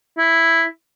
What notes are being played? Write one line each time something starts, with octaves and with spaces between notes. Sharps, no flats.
E4